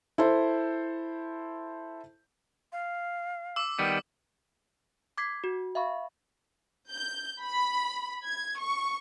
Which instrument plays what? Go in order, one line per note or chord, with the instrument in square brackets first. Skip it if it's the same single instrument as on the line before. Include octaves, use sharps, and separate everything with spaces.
[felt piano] E4 A4 C5
[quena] F5
[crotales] D6 E6
[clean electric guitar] D#3 G3 B3 [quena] G5
[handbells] D6 G#6 B6 C7
F#4
E5 F5 B5 C#6
[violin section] G6
B5
G#6
C#6